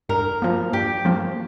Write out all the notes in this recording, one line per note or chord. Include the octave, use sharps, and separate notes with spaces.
G2 A#4
F3 A#3
G2 G4
F3 A#3